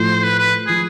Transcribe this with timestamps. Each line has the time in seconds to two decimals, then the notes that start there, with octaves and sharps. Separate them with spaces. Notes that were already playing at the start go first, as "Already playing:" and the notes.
Already playing: A2 F3 A3 E4 C5
0.24 B4
0.39 B4
0.67 F3 G#4